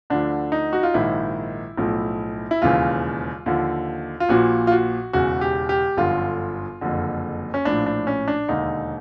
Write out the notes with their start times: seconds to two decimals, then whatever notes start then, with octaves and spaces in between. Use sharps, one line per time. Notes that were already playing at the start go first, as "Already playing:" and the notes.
0.10 D2 D3 F3 D4
0.52 D#4
0.73 F#4
0.83 F4
0.94 A#1 G#2 D#3 E4
1.78 B1 A2 F3
2.51 E4
2.61 E1 D#2 C#3 E3 F4
3.46 D#2 D3 F3
4.20 F4
4.29 A#1 A#2 F3 F#4
4.67 F4
4.72 F#4
5.13 E1 E2 C#3 F#4
5.41 G4
5.69 G4
5.97 G1 F#2 D3 F3 F4
6.81 F#1 F2 D3
7.54 C#4
7.65 A#1 A2 F3 D4
7.86 D4
8.07 C#4
8.28 D4
8.48 E1 D#2 D3 D#4